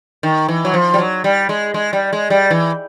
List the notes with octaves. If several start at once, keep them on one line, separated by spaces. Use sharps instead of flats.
D#3
E3
F#3
F3
G3
F#3
G3
G#3
G#3
G3
G#3
G3
E3